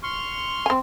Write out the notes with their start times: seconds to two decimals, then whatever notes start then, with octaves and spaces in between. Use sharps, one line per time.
0.03 C6 C#6 F6
0.66 C4 G#5